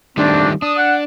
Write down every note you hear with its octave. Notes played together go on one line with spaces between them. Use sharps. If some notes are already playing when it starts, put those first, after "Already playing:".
D#3 G3 A3 C4 D4
D4 D#6
F#5